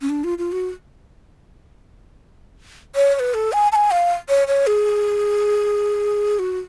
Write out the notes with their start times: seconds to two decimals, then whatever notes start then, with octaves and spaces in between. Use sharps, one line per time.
0.02 C#4
0.09 D4
0.24 F4
0.38 F4
0.52 F#4
2.96 C#5
3.15 C#5
3.20 B4
3.34 A4
3.53 G#5
3.72 A5
3.75 G#5
3.91 F5
4.29 C#5
4.48 C#5
4.67 G#4
6.39 F#4